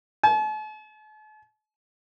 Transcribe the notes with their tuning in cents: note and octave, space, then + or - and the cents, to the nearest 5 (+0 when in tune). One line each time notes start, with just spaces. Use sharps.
A5 -45